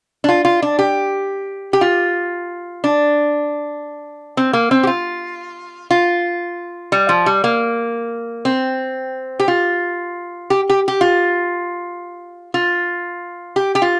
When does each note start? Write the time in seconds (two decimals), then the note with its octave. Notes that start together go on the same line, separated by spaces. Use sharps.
0.24 D4
0.29 F4
0.45 F4
0.62 D4
0.79 G4
1.73 G4
1.81 F4
2.84 D4
4.37 C4
4.53 A#3
4.71 C4
4.83 G4
4.87 F4
5.91 F4
6.92 G3
7.09 F3
7.26 G3
7.44 A#3
8.45 C4
9.40 G4
9.48 F4
10.50 G4
10.70 G4
10.88 G4
11.01 F4
12.54 F4
13.56 G4
13.75 G4
13.82 F4